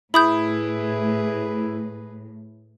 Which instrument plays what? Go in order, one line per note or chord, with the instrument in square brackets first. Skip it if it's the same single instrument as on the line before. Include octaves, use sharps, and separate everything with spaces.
[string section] A2 [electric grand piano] E4 [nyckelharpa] G#4 B4 [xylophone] B5 D#6 G6